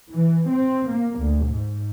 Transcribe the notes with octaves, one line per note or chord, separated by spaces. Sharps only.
E3
C4
A#3
D2
G#2